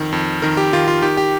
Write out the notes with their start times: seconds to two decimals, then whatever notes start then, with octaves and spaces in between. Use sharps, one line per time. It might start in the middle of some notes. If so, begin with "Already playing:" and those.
Already playing: F2 D#3
0.12 F2
0.42 D#3 A#4
0.57 G4
0.73 D#3 F4
0.88 F4
1.02 D#3 G4
1.17 G4